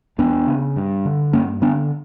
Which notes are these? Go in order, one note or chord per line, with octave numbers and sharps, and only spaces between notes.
E2 B3 D4
C#3
G2
D3
G2 A#3 C#4
D3 B3 D4